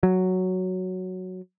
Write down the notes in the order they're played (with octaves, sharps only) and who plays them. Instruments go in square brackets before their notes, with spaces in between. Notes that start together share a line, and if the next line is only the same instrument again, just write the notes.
[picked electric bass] F#3